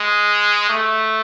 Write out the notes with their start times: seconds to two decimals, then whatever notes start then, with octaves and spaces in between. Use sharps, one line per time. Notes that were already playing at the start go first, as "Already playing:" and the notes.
Already playing: G#3
0.69 A3